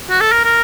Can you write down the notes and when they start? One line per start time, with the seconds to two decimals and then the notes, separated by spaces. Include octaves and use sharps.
0.10 F#4
0.21 A4
0.32 A#4
0.44 A#4